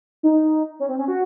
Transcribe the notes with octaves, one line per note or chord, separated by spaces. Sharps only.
D#4
C#4
C4
C#4
F#4